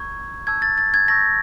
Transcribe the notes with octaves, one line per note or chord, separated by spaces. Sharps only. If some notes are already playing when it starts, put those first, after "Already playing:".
Already playing: A#5 C#6 E6 G6 G#6
A5 C#6 E6 G6 G#6
A6
A6
G#6
A5 C#6 E6 G6 A#6